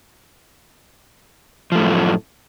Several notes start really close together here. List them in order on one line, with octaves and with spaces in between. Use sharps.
F3 A3 A2 F#2